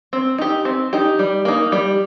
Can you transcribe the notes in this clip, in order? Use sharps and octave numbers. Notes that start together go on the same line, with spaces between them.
C4
D#4 G4
C4
D#4 G4
G3
A#3 D#4
G3